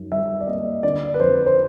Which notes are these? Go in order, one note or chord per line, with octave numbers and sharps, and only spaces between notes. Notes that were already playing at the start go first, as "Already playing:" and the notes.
Already playing: F#2 D#3
G3 E5
D5
A#3 D#5
D3 D5
B4
F2 C5
C5